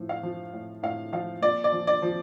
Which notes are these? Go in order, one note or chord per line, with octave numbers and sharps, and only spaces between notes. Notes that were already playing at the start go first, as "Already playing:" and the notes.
Already playing: A2 F3
F5
F3
A2
A2 F5
F3 F5
A#2 D5
D5
F3
D5
F3